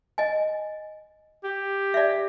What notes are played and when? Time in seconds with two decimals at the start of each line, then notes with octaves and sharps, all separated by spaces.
0.18 D#5 G#5
1.44 G4
1.94 D5 E5